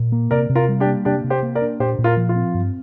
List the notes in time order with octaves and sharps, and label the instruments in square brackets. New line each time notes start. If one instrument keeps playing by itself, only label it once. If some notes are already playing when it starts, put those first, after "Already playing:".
Already playing: [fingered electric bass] A#2
A#3
[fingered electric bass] C3 [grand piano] A#4 D5
[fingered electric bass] C3
[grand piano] F4 A#4
[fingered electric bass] G3
[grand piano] D4 G4
[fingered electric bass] A#3
[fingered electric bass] C3 [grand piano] D4 G4
[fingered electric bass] C3
[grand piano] G4 C5
[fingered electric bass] A#3
[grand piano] A#4 D5
[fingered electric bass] D4
[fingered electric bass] A#2 [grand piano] G4 C5
[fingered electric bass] A#2
[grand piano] F4 A#4
[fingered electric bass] F3
[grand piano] F4
[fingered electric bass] C4
G2